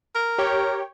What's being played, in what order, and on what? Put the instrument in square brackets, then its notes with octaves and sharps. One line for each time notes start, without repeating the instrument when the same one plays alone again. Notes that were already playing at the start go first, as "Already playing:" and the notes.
[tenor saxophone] A#4
[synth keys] G4 C#5 G5